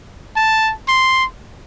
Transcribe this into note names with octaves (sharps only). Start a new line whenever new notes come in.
A5
C6